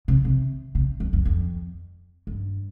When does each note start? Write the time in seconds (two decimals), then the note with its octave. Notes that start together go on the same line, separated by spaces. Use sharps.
0.08 C3
0.25 C3
0.75 C3
1.00 F2
1.13 F2
1.25 F2
2.27 G2